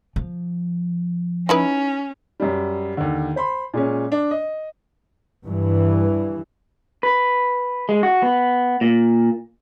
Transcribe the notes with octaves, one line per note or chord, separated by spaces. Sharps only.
F3
C#4 D#4 E4 B4
F#2 G3
D#2 D3
C5 B5 C6
A#2 G#3 C#4
D4
D#5
G2 E3
B4
G#3
F#4
B3
A#2